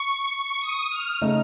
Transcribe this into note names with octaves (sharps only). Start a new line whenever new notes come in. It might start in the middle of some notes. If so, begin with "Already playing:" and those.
Already playing: C#6
D#6
F6
C#3 A3 D#4